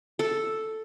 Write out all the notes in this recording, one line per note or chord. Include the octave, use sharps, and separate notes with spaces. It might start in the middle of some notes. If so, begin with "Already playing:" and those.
A4